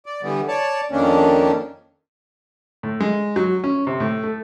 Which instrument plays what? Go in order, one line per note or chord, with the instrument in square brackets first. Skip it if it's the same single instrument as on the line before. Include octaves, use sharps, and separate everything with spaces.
[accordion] D5
D3 E3 G3 B3
C#5 D5 A5
F2 D#3 A#3 C#4 D4
[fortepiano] A2
G#3
F#3
C#4
C3
A2
A3